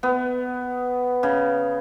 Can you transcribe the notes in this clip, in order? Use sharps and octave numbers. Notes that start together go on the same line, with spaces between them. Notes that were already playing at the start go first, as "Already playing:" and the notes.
B3
C#3